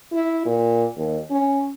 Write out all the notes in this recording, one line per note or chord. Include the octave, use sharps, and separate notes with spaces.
E4
A#2
D#2
C#4